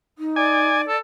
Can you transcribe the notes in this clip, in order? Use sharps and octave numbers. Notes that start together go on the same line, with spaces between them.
D#4
D5 G#5 D6
A4